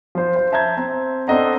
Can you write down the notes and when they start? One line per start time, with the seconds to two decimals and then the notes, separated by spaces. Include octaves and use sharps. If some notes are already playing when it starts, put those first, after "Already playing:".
0.15 F3 C5
0.36 C5
0.52 E5 A5 A#5 G6 G#6
0.77 C4
1.28 C4 D4 A4 D#5 F#5 A#5